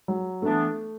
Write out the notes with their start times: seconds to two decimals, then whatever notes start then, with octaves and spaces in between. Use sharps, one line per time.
0.08 F#3
0.42 E3 A3 B3 D4